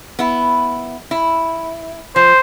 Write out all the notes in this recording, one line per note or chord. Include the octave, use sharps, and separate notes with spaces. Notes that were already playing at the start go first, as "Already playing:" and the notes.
B3 E4
E4
F3 C5